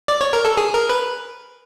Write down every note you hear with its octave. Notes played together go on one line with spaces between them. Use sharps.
D5
C#5
A#4
A4
G#4
A#4
B4